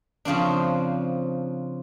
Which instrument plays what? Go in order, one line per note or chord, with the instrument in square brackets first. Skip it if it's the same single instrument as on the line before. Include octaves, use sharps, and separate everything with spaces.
[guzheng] C#3 F3 C4 D4